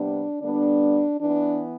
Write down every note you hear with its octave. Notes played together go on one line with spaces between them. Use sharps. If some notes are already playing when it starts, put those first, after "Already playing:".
Already playing: C3 G3 B3 D4
D3 G3 B3 D4
E3 B3 D4